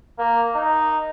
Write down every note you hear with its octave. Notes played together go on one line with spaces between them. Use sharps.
A#3
D#4